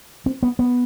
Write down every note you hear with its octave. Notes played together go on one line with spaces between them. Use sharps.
C4
B3
B3